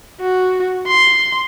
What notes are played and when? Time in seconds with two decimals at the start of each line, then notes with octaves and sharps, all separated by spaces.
0.21 F#4
0.87 C6